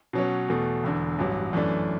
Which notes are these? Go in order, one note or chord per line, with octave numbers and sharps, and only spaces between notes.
B2 F#3 C#4
E2 B2 A3
E1 E2 D3
A1 G2 F#3
F#2 E3 A3 D4